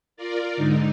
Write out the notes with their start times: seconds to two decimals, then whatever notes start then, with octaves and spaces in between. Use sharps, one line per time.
0.17 F4 A#4 D5
0.56 G#2 D3 D#4